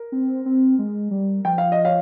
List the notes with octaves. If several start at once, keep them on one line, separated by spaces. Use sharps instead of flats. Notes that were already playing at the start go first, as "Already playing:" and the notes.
Already playing: A#4
C4
C4
G#3
G3
F3 G5
F5
D#5
C#5 F5